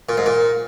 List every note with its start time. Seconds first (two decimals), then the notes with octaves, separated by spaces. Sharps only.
0.09 A#2
0.17 G#2
0.26 A#2